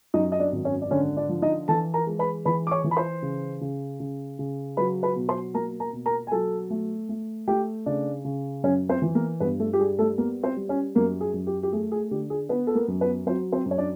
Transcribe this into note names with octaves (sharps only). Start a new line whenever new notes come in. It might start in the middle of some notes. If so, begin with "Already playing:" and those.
F#2 D#4 D#5
D#5
D4 D5
G#1
C#4 C#5
D5
D3 C#4 C#5
D4 D5
F3
D#4 D#5
E3 A4 A5
A#4 A#5
G#3
B4 B5
E3 B4 B5
D6
C#5 C#6
E3
B5
C5 C6
C#3
C#3
C#3
C#3
F#3 B4 B5
B4 B5
B2
C5 C6
A#3 A#4 A#5
A#4 A#5
B2
A#4 A#5
G#5
F#3 A4 A5
A3
A3
A3 G4 G5
C#3 D4 D5
C#3
F#2 C#4 C#5
C4 C5
E3
A#3 A#4
G2 B3 B4
A3 A4
G4
G3 G#4
A3 A4
A#3 B3 A#4
C4 C5
G3
C#4 C#5
F#2 A#3 A#4
G#4
F#2
G4
G4
A3 G#4
G#4
D3 G4
G#4
B3 B4
A4
A#3 A#4
F#2
B3 B4
F#3 C4 C5
C4 C5
F#2
C#5
D4 D5